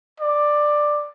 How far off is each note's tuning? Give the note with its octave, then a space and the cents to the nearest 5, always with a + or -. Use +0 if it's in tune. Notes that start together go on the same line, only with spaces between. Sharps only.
D5 +10